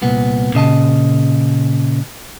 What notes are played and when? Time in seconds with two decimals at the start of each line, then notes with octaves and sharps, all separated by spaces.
0.02 C2 A#2 B3
0.54 A#2 C#3 D#5 A5